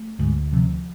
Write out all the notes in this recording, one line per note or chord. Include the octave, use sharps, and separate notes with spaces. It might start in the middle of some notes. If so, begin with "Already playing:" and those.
Already playing: A3
D2 G#2
C3 F3